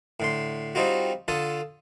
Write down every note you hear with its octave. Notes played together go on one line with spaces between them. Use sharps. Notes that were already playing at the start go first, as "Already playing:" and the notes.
A2 D3 C6
G3 C4 D#4 F4 F#4
D3 F4 A4 D#6